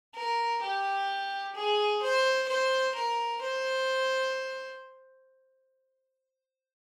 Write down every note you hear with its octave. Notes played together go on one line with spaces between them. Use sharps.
A#4
G4
G#4
C5
C5
A#4
C5